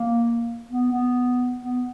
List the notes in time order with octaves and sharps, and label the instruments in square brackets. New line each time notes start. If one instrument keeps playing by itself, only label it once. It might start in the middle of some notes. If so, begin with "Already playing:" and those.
Already playing: [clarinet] A#3
B3
B3
B3